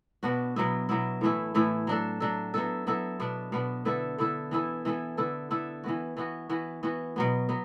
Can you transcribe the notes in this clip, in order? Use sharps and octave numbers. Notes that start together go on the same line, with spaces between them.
B2 B3 D4 F#4
B2 F#3 B3 E4
B2 F#3 B3 E4
A2 E3 A3 E4
A2 E3 A3 E4
F#3 D4 A4
F#3 D4 A4
F#3 B3 E4 A4
F#3 B3 E4 A4
B2 B3 D4
B2 B3 D4
D3 B3 E4 A4
D3 B3 E4 A4
E3 B3 E4 A4
E3 B3 E4 A4
D3 B3 E4 A4
D3 B3 E4 A4
E3 B3 F#4
E3 B3 F#4
E3 B3 F#4
E3 B3 F#4
B2 F#3 B3
F#3 B3